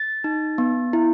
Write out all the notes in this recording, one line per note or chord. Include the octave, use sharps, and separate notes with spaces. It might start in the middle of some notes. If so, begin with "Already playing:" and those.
Already playing: A6
D#4
B3
E4